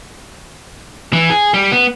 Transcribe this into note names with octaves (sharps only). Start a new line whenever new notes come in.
E3
G#4
G3
B3